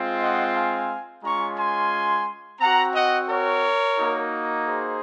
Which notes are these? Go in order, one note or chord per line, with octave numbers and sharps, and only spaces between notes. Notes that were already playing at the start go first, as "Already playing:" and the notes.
Already playing: G#3 C4 F4
D#5 F#5
F5 G#5
G#3 C#4 F4 A#5 C#6
G#5 C6
C4 F#4 F#5 A#5
D#5 F#5
A#4 C#5
A#3 D#4 F#4
G#4 C5